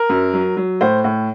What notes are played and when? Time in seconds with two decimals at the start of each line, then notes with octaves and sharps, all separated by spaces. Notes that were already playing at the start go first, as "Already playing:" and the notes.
Already playing: A#4
0.09 F#2
0.33 F#3
0.57 F#3
0.81 A2 C5
1.04 A2